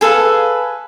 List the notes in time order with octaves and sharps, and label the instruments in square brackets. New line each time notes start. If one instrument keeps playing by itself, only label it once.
[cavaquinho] G#4 A4 B4 F5